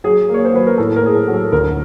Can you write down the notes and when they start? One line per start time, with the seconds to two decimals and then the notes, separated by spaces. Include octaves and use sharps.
0.04 F#3 G#4
0.29 A#3
0.34 C#5
0.45 C5
0.53 F#3 B4
0.67 A#4
0.78 A2 A4
0.96 A#4
1.03 A2 G#4
1.15 A4
1.28 F#3
1.34 A4
1.52 D2 A#4